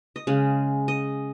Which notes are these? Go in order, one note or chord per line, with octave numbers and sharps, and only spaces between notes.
D#5
C#3 G#3 F5
D#5